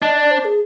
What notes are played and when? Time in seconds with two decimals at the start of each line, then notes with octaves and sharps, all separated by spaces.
0.02 D4 D#5
0.17 D5
0.31 C5
0.45 G#4